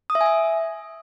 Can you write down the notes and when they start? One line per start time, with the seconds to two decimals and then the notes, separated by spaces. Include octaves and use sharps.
0.10 D#6
0.15 E5
0.21 G#5
0.26 E5